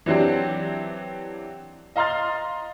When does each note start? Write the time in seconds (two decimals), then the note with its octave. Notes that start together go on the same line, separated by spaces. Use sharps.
0.06 E3 F#3 C4 D4 G4
1.96 D#5 F5 A#5 C6 F6 A6